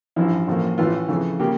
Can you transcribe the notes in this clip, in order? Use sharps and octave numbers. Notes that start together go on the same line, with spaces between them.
A1 G2 F3 E4
A1 A2 F3 A#3
A1 A2 E3 A3 F4
F2 C#3 E3 A3
C#3 G3 A#3 G4